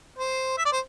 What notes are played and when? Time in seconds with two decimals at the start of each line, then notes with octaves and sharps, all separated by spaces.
0.18 C5
0.58 E5
0.65 D5
0.72 C5